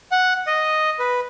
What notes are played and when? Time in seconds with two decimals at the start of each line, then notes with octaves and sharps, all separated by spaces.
0.12 F#5
0.47 D#5
0.99 B4